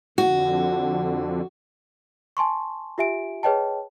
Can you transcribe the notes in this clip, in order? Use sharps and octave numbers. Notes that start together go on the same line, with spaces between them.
F2 D3 F#4
G#5 A5 C6 C#6
F4 G4 E5 G#5 D7
G#4 B4 C#5 D#5 G5 A5